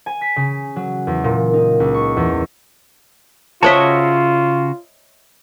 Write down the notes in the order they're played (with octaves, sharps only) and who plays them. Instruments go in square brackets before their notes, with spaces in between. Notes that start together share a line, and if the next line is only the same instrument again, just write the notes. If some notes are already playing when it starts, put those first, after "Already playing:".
[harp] G#5
B6
C#3
F#3
E2
A#2
D#4
C#2
C#6
E2
[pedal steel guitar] C#3 F#4 [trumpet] F4 [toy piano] C5 A5 [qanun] C#5 D#5 E5